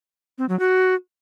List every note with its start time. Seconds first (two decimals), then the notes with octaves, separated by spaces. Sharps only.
0.38 C4
0.49 F#3
0.59 F#4